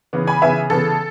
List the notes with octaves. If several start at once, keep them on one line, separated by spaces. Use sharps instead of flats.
C#3 E3 B3
G#5 B5
C#3 E3 B3 E5 G#5
C#3 E3 B3 A4